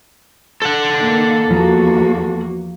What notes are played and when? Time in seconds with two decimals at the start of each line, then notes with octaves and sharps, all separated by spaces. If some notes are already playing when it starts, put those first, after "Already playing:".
0.62 A4 F#5
0.97 D#3 A#3
1.50 E2 F3 A#3 F#4 A#5